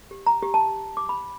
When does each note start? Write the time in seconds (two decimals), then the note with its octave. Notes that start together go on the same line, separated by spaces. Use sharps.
0.11 G4
0.26 A#5
0.42 G4
0.54 A5
0.97 D6
1.09 B5